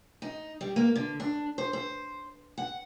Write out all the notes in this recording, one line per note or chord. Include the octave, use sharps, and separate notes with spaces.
D#4
G3
A#3
D3
D4
C5
C5
F#5